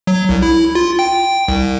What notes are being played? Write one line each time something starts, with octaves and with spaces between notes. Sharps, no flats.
F#3
C2
E4
F4
G5
C2